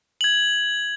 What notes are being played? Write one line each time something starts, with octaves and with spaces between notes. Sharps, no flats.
G#6 F#7